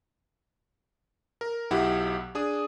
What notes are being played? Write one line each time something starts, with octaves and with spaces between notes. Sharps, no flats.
A#4
B1 F#3 E4 G4 F#5
D4 G#4 D#6